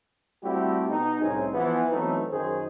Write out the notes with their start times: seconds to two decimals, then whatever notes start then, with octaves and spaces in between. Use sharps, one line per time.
0.44 G3 A3 C4 E4 F#4 G4
0.90 B2 D#4
1.21 C2 A2 C4 C#4 D#4 G#4
1.54 E3 F3 B3
1.91 E3 F#3 A3 B3 C4 D#4
2.31 F#2 D#3 G#4 C5